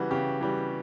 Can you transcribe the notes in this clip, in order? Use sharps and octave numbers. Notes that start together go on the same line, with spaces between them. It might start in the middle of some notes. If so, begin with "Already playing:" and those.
Already playing: C#3 E3 G3 F#4
C#3 G4
E3 G3